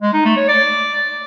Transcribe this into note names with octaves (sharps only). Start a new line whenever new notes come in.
G#3
D#4
A3
C#5
D5